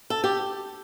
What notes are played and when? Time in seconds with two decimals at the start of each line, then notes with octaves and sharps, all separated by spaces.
0.10 A4
0.24 G4